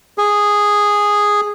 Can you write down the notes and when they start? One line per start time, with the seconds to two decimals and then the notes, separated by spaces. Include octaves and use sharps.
0.18 G#4